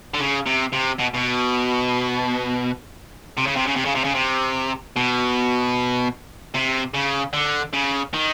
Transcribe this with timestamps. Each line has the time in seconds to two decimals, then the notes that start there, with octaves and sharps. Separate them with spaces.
0.14 D3
0.20 C#3
0.46 C3
0.72 C3
0.99 B2
1.14 B2
3.37 C3
3.47 C#3
3.56 C3
3.67 C#3
3.76 C3
3.85 C#3
3.95 C3
4.04 C#3
4.15 C3
4.96 B2
6.54 C3
6.94 C#3
7.33 D3
7.73 C#3
8.14 D#3